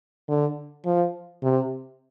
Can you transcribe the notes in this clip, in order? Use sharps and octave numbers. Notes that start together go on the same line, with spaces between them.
D3
F3
C3